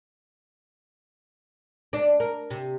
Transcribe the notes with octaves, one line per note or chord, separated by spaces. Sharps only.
D4
A#4
C3